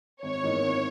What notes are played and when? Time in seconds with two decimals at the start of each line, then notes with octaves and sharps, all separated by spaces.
0.23 G#1 C#5
0.43 G#2 E3 A#3 D#4
0.63 G#1